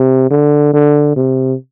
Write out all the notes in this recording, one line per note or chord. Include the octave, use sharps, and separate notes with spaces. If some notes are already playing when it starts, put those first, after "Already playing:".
Already playing: C3
D3
D3
C3